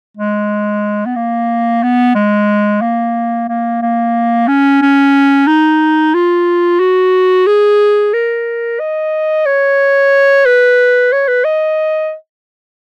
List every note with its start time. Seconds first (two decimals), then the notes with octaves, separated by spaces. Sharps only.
0.17 G#3
1.06 B3
1.16 A#3
1.83 B3
2.15 G#3
2.82 A#3
3.49 A#3
3.82 A#3
4.48 C#4
4.82 C#4
5.47 D#4
6.14 F4
6.80 F#4
7.47 G#4
8.13 A#4
8.80 D#5
9.46 C#5
10.46 B4
11.13 C#5
11.28 B4
11.45 D#5